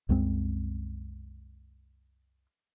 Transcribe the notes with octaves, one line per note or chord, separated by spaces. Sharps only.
C2 F#2 G#3 C4